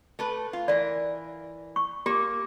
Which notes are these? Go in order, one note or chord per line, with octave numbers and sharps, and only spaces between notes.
A3 A4 B4
F4
E3 A#4 D5
C#6
A#3 G4